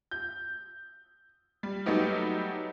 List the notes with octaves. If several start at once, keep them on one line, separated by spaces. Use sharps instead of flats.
G6
G3
F#3 G3 A3 B3 D#4 G4